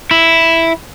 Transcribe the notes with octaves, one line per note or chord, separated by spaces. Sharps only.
E4